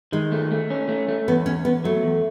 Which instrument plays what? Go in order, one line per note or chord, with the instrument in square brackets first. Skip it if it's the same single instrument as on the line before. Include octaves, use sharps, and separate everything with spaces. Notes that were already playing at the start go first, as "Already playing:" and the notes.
[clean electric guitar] D#3 [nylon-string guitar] G#3
[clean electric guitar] A3
A3
C#4
A3
A3
[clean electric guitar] E2 [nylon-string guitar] B3
[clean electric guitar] E2 [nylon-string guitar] C#4
[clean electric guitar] E2 [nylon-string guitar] B3
[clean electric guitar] F#3 [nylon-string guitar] A3
[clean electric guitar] E2